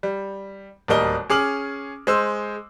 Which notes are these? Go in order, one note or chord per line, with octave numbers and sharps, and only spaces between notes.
G3
D1 D#2 G3 A#4 D#5 G7
C#4 G#4 D6 F6 F#7
G#3 C5 E6